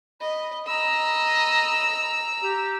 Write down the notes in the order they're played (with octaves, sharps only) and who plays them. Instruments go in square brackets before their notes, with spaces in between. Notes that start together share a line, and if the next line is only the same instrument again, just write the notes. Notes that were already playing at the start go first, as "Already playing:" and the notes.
[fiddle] D#5 [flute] B5
[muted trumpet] D#5 [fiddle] A#5 E6 [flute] B5
[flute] G4